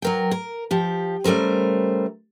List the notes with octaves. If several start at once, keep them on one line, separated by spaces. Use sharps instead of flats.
F#3 A#4 G5
A#4
F3 G4
C#3 G3 A3 A#4 C5